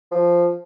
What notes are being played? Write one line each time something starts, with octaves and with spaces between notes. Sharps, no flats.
F3